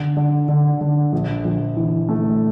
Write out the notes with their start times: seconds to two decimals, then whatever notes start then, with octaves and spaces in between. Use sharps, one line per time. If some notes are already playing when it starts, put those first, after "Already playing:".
Already playing: D3
0.17 D3
0.48 D3
0.81 D3
1.12 A#1
1.44 A#1
1.77 E3
2.09 A3